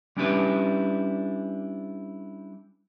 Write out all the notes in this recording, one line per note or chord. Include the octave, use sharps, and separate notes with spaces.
G3 C#4 D4 E4 G4 B4